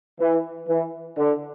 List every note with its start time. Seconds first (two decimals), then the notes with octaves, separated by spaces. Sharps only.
0.20 E3
0.68 E3
1.18 D3